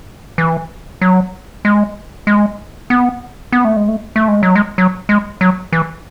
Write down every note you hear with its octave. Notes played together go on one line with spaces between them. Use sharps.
E3
F#3
G#3
G#3
B3
B3
A3
G#3
A3
A3
G#3
F#3
G#3
F#3
G#3
F#3
E3